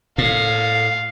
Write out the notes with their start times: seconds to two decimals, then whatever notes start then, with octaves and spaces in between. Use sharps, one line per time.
0.18 A2 F5